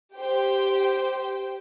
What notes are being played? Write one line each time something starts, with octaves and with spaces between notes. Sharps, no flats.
G4 C5 G5